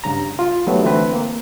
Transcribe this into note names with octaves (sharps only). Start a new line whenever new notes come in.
G2 C#3 A#5
F4
D#3 F#3 G3 A3 B3
D3 E3 A3 C4 B4
A#3